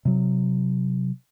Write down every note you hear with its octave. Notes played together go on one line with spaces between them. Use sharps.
C3 F#3